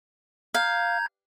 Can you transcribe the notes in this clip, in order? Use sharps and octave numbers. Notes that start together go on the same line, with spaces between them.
F5 A#5 G6 G#6